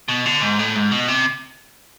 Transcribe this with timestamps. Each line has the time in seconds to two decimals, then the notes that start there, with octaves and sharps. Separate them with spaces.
0.08 B2
0.26 D3
0.42 G#2
0.59 A2
0.75 G#2
0.91 B2
1.08 C3